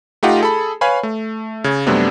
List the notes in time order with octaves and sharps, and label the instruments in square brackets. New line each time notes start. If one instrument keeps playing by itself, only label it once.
[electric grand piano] A3 D#4 F4 G4 D#5 F#5
G#4 A4 B5
B4 C#5 F5 G#5 B5
A3
C#3 G#6
F#2 C3 G3 A3 B3 D4